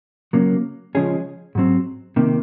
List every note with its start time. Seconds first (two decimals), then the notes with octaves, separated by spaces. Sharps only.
0.33 C#3 F#3 A#3
0.95 C#3 F3 G#3 C#4 G#4
1.55 G#2 F#3 C4
2.16 C3 D#3 A#3